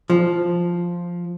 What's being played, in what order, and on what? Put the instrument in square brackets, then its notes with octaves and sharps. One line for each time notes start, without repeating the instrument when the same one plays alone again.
[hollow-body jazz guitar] F3